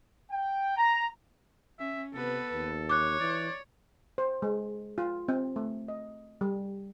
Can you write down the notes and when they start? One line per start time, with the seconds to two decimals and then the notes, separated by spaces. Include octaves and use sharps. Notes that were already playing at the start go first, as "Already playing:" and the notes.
0.31 G5
0.77 A#5
1.80 C#4 E5
2.14 C3 B3 A4 B4
2.52 D#2
2.89 C#5 D6 F#6
3.20 E3 D5
4.18 C5
4.42 G#3
4.98 F4
5.28 C4
5.56 A3
5.88 D#5
6.41 G3